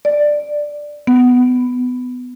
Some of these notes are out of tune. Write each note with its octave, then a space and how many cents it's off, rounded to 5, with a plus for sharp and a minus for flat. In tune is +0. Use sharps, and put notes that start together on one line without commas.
D5 +5
B3 +15